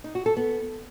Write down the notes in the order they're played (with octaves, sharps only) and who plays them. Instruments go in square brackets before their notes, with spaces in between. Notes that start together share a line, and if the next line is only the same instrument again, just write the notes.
[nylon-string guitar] D#4
F#4
A4
B3